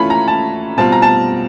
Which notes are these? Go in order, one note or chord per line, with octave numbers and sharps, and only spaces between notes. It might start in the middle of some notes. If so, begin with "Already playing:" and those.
Already playing: E3 A3 C#4 F4 B5
A#5
A5
B2 G3 C4 F4 A5
A#5
A5